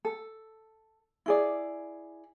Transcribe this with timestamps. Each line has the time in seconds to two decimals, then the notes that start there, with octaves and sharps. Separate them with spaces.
0.05 A4
1.26 E4 G#4 D5